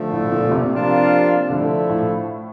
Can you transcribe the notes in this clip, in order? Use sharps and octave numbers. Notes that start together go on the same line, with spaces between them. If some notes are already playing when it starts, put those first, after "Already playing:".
Already playing: D3 F3 A3
A2
A#2
A#2
C3
F3 A#3 D4 F4
D3 F3 A3 E4
A2